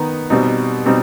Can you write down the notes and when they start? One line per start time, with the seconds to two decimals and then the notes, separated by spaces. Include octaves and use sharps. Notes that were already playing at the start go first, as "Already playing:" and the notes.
Already playing: D#3 B3 D#4
0.30 B2 G3 C4 D#4
0.86 B2 G3 C4 D#4